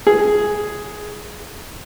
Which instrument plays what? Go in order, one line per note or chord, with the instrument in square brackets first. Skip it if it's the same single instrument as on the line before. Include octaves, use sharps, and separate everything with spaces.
[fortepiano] G#4